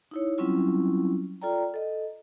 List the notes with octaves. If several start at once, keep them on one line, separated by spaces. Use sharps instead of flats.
D#4 E4 C#5
F#3 G3 C4 C#4 E4 F4
F4 A4 D5 G5 A#5
A4 D#5